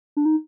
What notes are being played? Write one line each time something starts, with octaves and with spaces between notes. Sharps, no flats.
D4
D#4